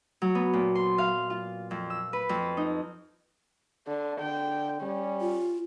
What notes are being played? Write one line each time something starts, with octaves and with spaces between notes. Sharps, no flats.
F#3
B3
A#2
C6
F5
F4
F2
E6
B4
F2
D#4
D3
D3 G5
G3 C#4
F4